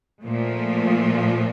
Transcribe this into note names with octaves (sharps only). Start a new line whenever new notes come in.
A#2 F3 A3